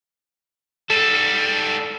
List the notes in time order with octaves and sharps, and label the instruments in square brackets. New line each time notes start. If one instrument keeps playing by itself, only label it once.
[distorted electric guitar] G#2 G3 [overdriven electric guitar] A4